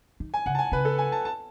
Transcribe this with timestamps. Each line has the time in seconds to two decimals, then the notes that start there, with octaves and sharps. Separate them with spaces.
0.20 D#3
0.34 G#5
0.46 C#3 F#5
0.55 A5
0.59 G#5
0.72 C#3 B4
0.85 A4
0.98 G#5
1.12 A5
1.25 A5